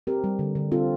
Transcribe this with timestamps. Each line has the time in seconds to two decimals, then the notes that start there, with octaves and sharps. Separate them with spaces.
0.07 C4 G4 A#4
0.24 G3
0.39 D3
0.55 D3
0.72 C4 F4 A4